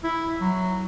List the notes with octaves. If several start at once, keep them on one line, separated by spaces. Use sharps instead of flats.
E4
F#3